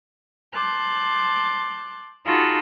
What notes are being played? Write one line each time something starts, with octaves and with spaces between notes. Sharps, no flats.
A5 C6 D6 F#6 G6
D#4 F4 F#4 G#4 A4 B5